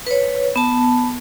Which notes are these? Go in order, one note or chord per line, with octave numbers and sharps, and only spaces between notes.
B4 C#5
B3 A5